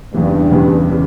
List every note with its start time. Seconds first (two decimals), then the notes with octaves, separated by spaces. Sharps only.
0.13 E2 G2 C#3 E3 G3
0.52 E2 C#3 E3 G3
0.89 C#3 E3 G3